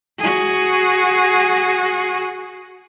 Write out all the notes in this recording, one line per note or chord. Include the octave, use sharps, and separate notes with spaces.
F#4 G#4